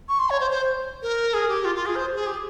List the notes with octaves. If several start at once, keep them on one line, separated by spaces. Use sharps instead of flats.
C#6
C6
C#5
C5
C5
A#4
G#4
G4
F4
F4
G#4
C5
G#4
G4